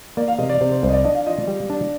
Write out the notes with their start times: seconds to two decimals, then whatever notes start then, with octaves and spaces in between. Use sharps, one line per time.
0.17 A#3 D5
0.28 F5
0.39 C3 D#5
0.49 D5
0.60 C3 C5
0.72 C5
0.83 C2 C5
0.89 D#5
0.93 D5
1.04 D4 D#5
1.15 F5
1.26 F4 D#5
1.37 D5
1.48 G3
1.70 D4